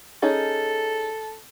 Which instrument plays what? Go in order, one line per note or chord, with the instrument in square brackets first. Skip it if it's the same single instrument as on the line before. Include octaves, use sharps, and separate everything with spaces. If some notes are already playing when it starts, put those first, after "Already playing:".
[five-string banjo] C#4 D#4 G#4 [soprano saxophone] A4